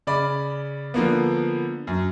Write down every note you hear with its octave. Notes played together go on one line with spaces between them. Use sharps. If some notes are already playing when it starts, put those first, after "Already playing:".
C#3 D5 B5
D3 F3 A#3 B3
F#2